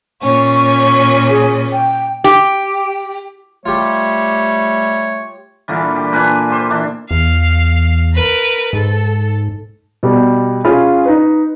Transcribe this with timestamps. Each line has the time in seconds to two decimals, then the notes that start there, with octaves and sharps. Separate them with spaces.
0.22 A#2 C#4 C#6
1.30 G#4
1.72 G5
2.24 G4
3.66 G3 A3 F4 G4 C#5
5.68 A#2 D3 E3 G3
5.96 G4
6.13 A#2 D4 B4 G#5
6.50 G4 C5
6.70 E3 D4
7.11 E2 F5
8.13 A#4 B4
8.73 G#2 A4
10.03 B2 G3 G4
10.65 C#4 F4 G#4 F5 B5
11.05 D#4 B4